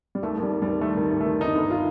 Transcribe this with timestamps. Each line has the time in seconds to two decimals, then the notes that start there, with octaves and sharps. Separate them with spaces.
0.15 G3
0.23 D#2 A3
0.38 D#2
0.43 G3
0.52 D#2
0.62 G3
0.67 D#2
0.81 D#3 A3
0.97 D#3
1.11 D#2
1.21 A3
1.26 D#3
1.40 G1 D#4
1.55 G1
1.70 F4